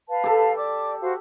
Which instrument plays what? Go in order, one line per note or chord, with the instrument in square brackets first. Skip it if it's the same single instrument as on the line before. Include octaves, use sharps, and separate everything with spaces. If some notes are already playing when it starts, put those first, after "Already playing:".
[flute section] B4 F5 A5
[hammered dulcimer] G4 A4
[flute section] D5 D6
F#4 C5 F5